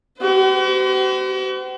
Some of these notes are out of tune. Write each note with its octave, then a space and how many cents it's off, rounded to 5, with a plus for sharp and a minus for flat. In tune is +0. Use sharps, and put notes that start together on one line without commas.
F#4 +45 C5 -45